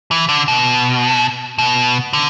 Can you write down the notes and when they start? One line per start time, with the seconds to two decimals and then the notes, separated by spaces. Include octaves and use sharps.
0.11 E3
0.29 D3
0.48 B2
1.58 B2
2.13 D3